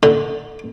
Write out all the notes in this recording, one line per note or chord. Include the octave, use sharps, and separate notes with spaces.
D3